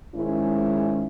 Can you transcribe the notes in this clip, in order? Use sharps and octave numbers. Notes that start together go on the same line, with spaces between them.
G#2 D#3 G#3 C#4 E4